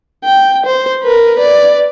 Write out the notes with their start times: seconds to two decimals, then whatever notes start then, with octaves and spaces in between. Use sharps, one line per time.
0.25 G5
0.66 C5
1.03 A#4 B4
1.37 B4 D5